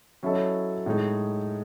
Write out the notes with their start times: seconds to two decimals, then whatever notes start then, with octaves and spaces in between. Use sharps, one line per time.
0.23 F#3 C#4 E4 A4 D#5
0.86 A2 G#3 D#4